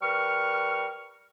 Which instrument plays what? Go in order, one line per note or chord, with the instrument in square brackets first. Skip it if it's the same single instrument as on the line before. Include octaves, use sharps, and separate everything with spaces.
[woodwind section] G3 A#4 B4 C#6 F6